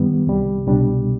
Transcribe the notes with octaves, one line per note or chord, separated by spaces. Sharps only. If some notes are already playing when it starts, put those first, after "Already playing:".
Already playing: G2 D#3 G3 B3
C2 C3 G3
C2 B2 G3 D4